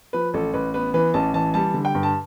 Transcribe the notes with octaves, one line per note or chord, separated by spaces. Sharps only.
F3 B4
A1 A4
A1 B4
B3 B4
E3 B4
A1 A5
E3 A5
G3 A5
D3
G5
G2
A5